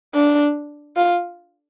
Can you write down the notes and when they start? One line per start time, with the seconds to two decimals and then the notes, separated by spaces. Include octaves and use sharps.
0.15 D4
0.97 F4